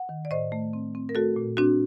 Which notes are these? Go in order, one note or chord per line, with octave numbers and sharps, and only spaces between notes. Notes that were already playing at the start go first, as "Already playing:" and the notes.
Already playing: F#5
D#3
D5
A2 C5 D#5
A3
C4
C4
A#4
A3 F#4 A4
A#2
C4 D4 F#4